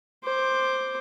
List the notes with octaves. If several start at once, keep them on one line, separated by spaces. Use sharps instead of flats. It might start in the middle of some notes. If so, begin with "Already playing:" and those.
C5 D6